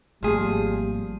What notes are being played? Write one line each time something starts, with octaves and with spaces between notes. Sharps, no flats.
G#1 F3 G3 A3 A#3 G#4